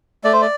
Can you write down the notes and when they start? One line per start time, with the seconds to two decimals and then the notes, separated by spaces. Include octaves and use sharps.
0.24 A3 D5
0.33 C5
0.41 D5